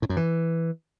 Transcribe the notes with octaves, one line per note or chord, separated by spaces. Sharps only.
A2
F#2
E3